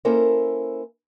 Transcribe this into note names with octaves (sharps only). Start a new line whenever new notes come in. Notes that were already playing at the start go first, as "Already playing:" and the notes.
A#3 C#4 E4 A4 A#4 C5